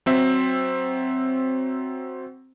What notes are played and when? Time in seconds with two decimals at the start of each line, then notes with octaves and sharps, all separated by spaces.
0.06 F#3 C4 E5